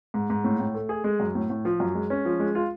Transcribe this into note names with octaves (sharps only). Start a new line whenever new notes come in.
G#2
G#2
A2
A2
A3
G#4
G#3
F#2
A2
A2
F3
F#2
G#3
C#4
F3
G#3
F4